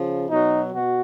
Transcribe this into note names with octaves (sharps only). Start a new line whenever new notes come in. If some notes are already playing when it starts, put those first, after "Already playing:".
Already playing: C#3 F3
B2 F#3 D#4
B2 F#4